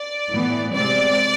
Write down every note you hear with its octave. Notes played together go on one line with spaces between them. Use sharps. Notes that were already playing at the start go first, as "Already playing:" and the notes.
Already playing: D5
A2 E3 B3
C3 G#3 C4 D5